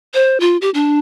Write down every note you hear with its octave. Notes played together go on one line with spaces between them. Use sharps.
C5
F4
G4
D4